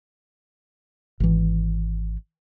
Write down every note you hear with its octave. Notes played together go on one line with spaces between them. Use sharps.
G#1 E3